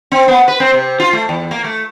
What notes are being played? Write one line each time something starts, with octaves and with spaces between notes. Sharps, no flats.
C4
B3
B4
C4
C3
F4
A3
E2
A#3
A3